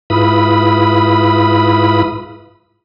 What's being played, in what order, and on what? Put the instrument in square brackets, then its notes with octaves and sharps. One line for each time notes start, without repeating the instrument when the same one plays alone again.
[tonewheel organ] G#2 E4 F4 B4 B5 D#6